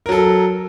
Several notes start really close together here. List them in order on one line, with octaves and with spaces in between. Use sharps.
A#4 F#3 A4